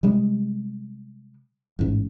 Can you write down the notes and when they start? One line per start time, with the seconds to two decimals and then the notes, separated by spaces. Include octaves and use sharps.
0.03 C3 G3 G#3
1.79 A1 G#2